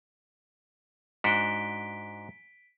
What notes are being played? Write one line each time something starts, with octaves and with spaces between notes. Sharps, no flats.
G#2 D4 F#4 B6 D7 G7